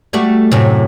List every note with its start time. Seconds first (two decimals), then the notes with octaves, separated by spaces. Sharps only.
0.13 G3 A3 F#4
0.52 F#2 A2 C3